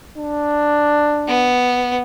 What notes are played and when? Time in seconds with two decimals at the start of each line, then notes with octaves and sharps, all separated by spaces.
0.17 D4
1.27 B3